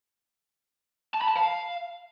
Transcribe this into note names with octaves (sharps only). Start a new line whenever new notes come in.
A5
B5
A5
F5